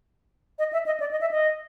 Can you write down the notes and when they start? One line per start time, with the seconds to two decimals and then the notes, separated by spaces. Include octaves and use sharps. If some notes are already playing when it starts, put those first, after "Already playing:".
0.59 D#5
0.73 E5
0.86 D#5
1.00 D5
1.11 D#5
1.21 E5
1.31 D#5